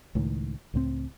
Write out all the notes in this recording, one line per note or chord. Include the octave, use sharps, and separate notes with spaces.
C#2 A2 D#3
C#2 A2 A3 C4